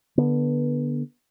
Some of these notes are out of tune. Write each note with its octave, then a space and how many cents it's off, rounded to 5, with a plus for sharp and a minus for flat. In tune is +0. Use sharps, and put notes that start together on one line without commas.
D3 +0 B3 -25